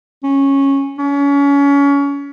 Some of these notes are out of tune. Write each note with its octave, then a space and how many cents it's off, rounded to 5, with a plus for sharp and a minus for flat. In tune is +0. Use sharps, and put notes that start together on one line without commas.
C#4 -10
C#4 +30